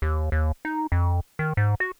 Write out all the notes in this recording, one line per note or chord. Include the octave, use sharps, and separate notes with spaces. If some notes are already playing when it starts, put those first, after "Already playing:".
D#2
D#2
D#4
F2
D#3
G#2
F#4